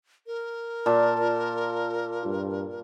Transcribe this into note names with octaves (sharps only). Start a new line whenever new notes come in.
A#4
A#2 A5
F4
G2